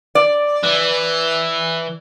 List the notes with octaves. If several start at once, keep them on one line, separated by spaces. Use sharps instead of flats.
D5
E3